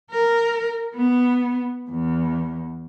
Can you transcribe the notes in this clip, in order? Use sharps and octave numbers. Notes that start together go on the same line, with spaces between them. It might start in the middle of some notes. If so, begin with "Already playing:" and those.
A#4
B3
E2